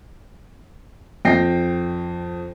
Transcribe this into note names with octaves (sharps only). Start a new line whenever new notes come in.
F2 G5 A#6 C7